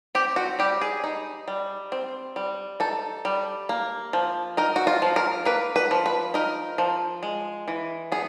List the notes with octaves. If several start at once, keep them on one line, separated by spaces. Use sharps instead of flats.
C4 G4
F#4
G3 G4
G#4
D#4
G3
C4
G3
D#4 A4
G3
A#3
F3
D#4 A#4
F#4
F4
F3
A#4
A#3 B4
B4
F3
B4
D#4 A#4
F3
G#3
E3
B3 G#4